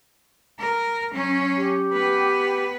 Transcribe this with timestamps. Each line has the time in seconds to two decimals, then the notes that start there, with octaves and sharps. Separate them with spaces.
0.59 A#4
1.11 F#3 C#4
1.57 G4
1.92 B3 B4